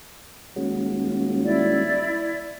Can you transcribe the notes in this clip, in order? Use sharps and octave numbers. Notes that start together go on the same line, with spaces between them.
D#1 G#3 C#4 F#4
E4 D5